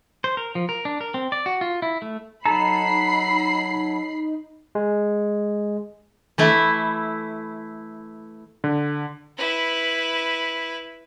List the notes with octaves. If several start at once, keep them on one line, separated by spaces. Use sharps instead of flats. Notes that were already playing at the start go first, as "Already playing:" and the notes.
C5
A#4
F3
A#4
D4
A#4
C4
D5
F#4
F4
E4
A3
F#3 D#4 A4 A#5 B5 C7
G#3
E3 A3 E4
D3
E4 B4